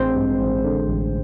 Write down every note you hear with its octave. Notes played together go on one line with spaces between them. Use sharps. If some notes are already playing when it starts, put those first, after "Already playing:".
Already playing: A1 D3 G#3 C4 C5
G2
A1
D3
A1